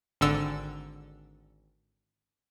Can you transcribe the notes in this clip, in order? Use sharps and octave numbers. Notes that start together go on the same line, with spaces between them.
G#1 D3 E6